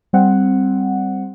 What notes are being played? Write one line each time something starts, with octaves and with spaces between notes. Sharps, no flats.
G3 C4 F#5